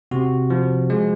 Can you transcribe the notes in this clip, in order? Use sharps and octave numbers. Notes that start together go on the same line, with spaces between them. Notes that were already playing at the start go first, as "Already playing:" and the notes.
C3 F#4
F3
G#3